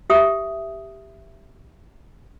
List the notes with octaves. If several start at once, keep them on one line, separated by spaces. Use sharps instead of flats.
G4 E5 D#6